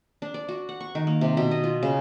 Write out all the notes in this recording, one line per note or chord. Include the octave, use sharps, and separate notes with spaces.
D4
D5
F#4
F#5
C#6
D#3
A#3
C3
B2
D#5
F4
C#3